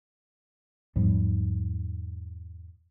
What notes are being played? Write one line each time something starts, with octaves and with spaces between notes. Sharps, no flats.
E2 G#2 F3 G3